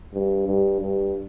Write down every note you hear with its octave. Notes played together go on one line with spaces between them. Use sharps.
G2
G2
G2